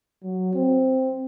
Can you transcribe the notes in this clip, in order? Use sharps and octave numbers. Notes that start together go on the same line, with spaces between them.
F#3
C4